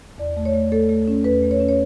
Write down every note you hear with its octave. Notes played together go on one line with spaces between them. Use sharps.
E2 D5
A3
C#5
A3
A3 A4
A3
C#4
E2 B4
A3
C#5
C#4
C#5